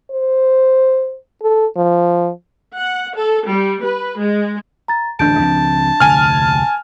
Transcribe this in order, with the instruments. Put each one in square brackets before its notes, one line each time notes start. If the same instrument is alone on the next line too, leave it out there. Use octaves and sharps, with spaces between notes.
[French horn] C5
A4
F3
[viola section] F#5
A4
G3
B4
G#3
[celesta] A#5 A6
[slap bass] D1 A1 [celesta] D4 G6 D7 [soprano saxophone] A5
[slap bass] C#2 F3 C4
[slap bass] F1 D2 D3 [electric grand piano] G#5 F6